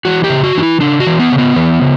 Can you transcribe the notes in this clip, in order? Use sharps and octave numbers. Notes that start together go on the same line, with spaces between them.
E3 F#4
G4
C#3
F#4
E3 D4
E4
C#3 D4
F#4
E3
B3
C#3
B3
E3
C#3